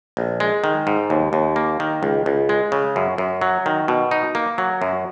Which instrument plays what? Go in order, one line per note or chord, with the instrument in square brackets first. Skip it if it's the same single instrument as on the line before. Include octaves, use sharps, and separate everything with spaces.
[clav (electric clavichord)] A#1
G#3
D#3
G#2
D#2
D#2
A#3
D#3
C#2
C#2
G#3
C#3
F#2
F#2
F#3
D#3
B2
D#4
A#3
F#3
F#2